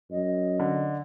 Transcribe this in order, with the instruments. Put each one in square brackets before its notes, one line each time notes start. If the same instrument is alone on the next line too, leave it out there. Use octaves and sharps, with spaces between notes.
[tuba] F#2 [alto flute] D#5
[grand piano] D3